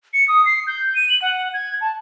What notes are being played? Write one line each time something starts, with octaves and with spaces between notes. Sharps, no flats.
C#7
D#6
C7
G6
D#7
F#7
F#5
G#6
A5